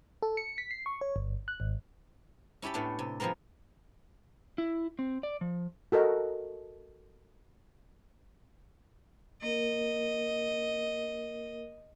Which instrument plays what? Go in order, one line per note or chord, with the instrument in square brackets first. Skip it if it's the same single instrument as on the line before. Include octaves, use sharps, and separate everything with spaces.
[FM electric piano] A4
C#7
B6
C7
C#6
C#5
G1
F#6
G#1
[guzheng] C#4 E4 G4 A5 B5
A2 A3 B3 C#4 D4
C3
F3 G#3 B3 C4 A#4
[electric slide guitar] E4
C4
D5
F3
[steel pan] F#4 A4 A#4 D#5
[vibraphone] A#3 A#4 [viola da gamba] D#5